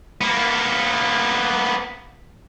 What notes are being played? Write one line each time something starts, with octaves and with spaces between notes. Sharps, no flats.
A#3 B3